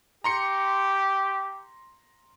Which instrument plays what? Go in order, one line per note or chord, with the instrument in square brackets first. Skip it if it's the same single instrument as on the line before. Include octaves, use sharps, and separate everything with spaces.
[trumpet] G4 [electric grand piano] A#5 C6 C#7